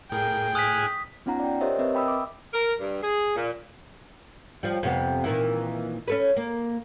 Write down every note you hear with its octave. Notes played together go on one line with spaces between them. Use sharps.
A2 G#4 A#4 G5
G#5 D#6 F6 F#6 B6
B3 C#4 D#4 F4 F#5 A#5
D5 G5
G4 A#4 C5 C#5 D#5 E5
C4 A#4 B4 D#5 E5
G5 B5 D#6 E6
E5 D6
A#4
G2
G#4
A#2
F3 G3
F2 C3 B3
A#2 D#3 E3
C#4 A4 B4
A#3